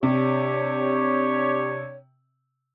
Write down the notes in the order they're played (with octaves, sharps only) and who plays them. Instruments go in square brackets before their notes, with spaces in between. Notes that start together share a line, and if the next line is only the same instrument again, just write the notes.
[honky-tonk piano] C3 [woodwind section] D4 G4 C#5